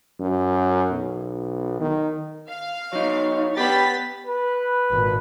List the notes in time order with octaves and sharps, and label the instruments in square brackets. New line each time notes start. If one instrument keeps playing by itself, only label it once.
[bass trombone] F#2
B1
D#3
[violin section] F5
[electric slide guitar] F#3 D#4 [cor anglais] C#5
[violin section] B3 A6 B6 [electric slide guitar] G4 B4 [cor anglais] G5
[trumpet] B4
[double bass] G#1 A#2